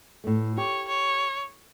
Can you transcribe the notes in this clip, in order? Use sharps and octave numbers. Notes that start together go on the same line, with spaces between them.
A2 A3
G4 C#5
C#5